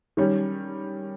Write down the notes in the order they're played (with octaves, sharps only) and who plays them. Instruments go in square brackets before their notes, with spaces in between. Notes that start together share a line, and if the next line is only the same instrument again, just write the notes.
[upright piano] D#3 G3 C#4